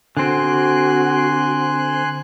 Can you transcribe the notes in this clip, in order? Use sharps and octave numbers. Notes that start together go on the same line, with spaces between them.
D3 C4 F#4 G#5 C6 F#6